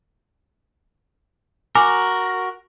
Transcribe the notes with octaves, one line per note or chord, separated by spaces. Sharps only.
F#4 A#4 G#5 D6